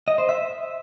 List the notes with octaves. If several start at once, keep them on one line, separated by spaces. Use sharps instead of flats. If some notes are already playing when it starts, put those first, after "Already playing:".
D#5
C5
E5